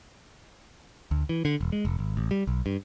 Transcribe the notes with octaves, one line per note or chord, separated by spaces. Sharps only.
D2
E3
D3
E1
G#3
F1
G#1
A1
G3
B1
G2